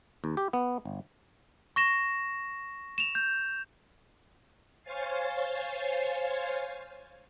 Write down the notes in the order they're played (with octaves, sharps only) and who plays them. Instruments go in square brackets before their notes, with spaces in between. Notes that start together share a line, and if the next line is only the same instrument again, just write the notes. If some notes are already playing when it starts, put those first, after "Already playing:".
[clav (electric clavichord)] D#2
G4
B3
G1
[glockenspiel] C#6 A#6 E7
E7 F7
G6
[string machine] C5 C#5 F5 G#5 A6 C7